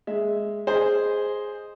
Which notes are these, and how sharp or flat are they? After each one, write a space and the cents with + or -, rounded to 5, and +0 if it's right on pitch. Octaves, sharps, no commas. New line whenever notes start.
G#3 +0 E5 +0
G#4 +0 C5 +0 D#5 +0